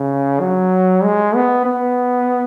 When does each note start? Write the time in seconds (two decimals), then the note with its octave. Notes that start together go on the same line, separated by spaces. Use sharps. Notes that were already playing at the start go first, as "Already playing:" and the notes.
Already playing: C#3
0.41 F#3
1.04 G#3
1.35 B3
1.65 B3